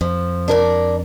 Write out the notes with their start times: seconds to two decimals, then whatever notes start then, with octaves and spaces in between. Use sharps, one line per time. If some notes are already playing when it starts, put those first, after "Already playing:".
0.01 F2 F3
0.48 D4 A#4 D5